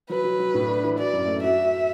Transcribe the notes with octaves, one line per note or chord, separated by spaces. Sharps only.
F#3 B4
F#3
F#3
A2
D4
E3
F#4 D5
F#2
A3
F#4 E5
F#4